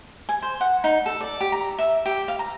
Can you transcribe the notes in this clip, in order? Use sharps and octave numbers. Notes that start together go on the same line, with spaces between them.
G#5
C5
F#5
D#4
A4
D5
G4
A#5
E5
G4
F5
A#5